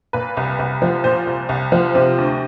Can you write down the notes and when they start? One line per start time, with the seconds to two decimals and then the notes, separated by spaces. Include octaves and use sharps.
0.13 A#2 B4
0.37 C2
0.59 C2
0.82 F3
1.04 A#2 C5
1.27 C2
1.49 C2
1.72 F3
1.95 C3
2.18 D2